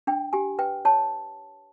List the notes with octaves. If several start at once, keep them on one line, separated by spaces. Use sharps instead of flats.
D4 G5
G4 G#5
B4 G5
C#5 A5